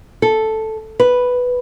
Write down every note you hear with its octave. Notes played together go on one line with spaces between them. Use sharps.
A4
B4